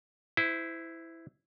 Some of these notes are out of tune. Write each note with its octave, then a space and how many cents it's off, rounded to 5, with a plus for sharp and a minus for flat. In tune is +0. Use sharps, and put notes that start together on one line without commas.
E4 +0 C5 -30